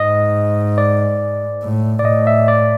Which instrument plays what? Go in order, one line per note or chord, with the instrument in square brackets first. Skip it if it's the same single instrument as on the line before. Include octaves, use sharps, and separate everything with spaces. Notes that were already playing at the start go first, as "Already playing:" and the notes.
Already playing: [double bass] G#2 [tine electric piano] D#5
[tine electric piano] D5
[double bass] A2
[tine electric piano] D5
[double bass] A2 [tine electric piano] D#5
[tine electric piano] E5
D5